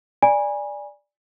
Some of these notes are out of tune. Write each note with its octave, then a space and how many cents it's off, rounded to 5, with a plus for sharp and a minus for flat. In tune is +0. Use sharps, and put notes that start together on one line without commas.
D5 +0 G#5 -20 B5 -40